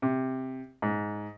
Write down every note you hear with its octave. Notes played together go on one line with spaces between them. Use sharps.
C3
G#2